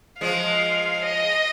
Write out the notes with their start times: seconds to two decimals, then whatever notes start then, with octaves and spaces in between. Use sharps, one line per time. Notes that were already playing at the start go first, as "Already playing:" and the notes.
0.21 F3 G#3 F5
1.05 D#5